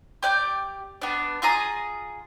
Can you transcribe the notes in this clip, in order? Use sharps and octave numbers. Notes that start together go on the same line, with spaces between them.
G4 D5 G6
B3 D4
F4 G#4 A#5 D#6